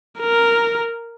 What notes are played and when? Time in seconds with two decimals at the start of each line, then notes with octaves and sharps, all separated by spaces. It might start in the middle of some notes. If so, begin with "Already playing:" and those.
0.21 A#4